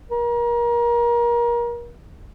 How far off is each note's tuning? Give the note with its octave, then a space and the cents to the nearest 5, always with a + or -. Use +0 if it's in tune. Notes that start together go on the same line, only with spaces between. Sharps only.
A#4 +30